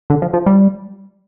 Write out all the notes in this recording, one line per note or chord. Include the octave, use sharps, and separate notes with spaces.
D3
F3
F3
G3